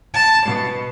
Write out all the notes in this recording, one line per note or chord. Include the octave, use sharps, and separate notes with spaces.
A5
B2